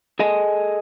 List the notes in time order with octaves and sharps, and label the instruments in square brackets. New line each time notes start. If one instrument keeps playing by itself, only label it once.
[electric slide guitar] G#4 A4 D#5 G#5